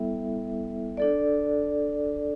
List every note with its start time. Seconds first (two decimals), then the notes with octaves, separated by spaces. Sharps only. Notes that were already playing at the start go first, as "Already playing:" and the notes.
Already playing: G3 B3 E4 A4 E5
0.97 D4 A4 D5